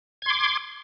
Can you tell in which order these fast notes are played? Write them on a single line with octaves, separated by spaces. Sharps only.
G#6 C6 D6